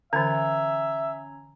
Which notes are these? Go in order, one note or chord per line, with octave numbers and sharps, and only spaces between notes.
D3 E3 C#4 E5 A#5 G#6